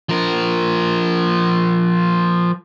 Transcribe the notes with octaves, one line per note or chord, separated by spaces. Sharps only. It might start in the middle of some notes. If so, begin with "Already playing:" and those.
F3 A#4